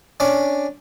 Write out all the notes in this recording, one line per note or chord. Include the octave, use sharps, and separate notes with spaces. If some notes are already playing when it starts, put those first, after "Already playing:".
C#4 D4 D6